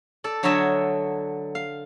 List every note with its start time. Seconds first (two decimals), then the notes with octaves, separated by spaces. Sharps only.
0.24 A4 D5
0.43 D3 F#3 C#5 D#5 E5 A5
1.55 F5